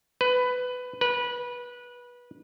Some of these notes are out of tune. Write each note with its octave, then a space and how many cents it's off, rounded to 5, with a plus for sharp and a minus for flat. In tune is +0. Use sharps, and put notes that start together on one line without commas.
B4 +15
B4 -20